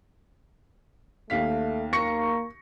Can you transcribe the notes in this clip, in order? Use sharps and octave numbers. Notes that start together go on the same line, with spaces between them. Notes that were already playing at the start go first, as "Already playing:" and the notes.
D#2 A3 F5 B6
A#3 C#6 A#6 C#7